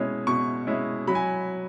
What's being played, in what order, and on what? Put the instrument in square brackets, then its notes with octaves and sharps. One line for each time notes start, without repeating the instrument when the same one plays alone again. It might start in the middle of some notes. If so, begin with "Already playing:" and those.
Already playing: [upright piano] B2 G#3 C#4 E4
B2 C#6
G#3 C#4 E4
F#3 B5
G#5